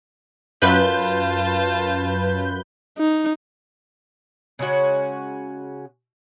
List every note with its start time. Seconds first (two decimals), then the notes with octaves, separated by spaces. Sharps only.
0.62 F#2 F4 B4 A5 G6
2.98 D#4
4.59 C#3 G#3 C#4 F#4